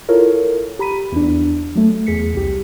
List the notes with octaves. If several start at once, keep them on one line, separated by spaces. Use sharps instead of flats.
E4 F4 A4 A#4 C#5
G4 A#5 B5 B6 D#7
E2 D4
F#3 A3
E2 G#4 B6 C#7
C2 G4